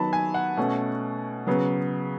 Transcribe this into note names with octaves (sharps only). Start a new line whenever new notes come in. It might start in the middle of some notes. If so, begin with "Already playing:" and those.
Already playing: D#3 F#3 B3 A5 B5
G#5
F#5
B2 A3 C#4
C#3 F#3 B3